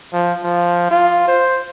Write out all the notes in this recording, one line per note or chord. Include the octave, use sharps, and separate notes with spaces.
F3
F3
F4
C5